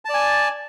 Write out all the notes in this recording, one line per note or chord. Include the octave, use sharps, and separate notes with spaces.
D5 G#5 A5